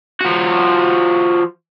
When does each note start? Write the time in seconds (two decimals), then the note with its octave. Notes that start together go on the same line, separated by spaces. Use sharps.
0.21 F3 F#4